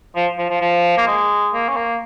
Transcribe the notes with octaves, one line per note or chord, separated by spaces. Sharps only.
F3
F3
F3
F3
A#3
G#3
A#3
C#4
A#3